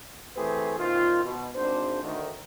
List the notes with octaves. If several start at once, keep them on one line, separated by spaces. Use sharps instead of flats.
E3 A3 C4 G4 G#4 B4
A#2 D#3 C4 F4
B2
G#1 D4 C5
D2 D#3